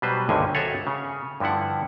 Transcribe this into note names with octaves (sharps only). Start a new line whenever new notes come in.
B2 F#3 G3 B4 C5
G#1 C#2 G2 D3 D#3 G#5
F#4 G#4 A4 C#5 E5 F#5
C#3
G2 D3 F3 E4 F#5